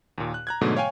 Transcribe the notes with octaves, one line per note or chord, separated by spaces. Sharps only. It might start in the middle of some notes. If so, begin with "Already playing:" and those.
D#2 A#2
F#6
A#5 F#6 G#6
G#2 B2 D3 F#3 A3
C#5 F5 G5 G#5